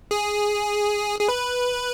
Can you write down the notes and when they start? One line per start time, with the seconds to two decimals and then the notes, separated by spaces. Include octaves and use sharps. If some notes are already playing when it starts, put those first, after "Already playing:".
0.11 G#4
1.20 G#4
1.28 B4